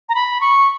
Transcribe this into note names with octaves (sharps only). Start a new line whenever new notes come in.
A#5
B5
C#6